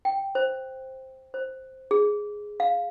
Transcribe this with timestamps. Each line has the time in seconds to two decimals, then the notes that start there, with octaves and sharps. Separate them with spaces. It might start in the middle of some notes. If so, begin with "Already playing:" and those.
0.05 G5
0.35 C5
1.34 C5
1.91 G#4
2.60 F5